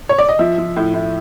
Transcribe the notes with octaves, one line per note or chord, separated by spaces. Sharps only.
C#5
D5
D#5
F3 E5
F3
A2
A2